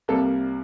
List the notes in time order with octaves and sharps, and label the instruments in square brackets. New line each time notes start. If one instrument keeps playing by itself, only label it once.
[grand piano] C2 C3 G3 A#3 A4